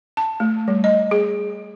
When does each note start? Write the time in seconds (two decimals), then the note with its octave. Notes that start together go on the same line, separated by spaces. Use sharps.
0.17 A5
0.40 A3
0.68 G3
0.84 D#5
1.11 G#4